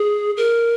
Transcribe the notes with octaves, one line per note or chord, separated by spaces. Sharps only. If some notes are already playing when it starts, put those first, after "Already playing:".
Already playing: G#4
A#4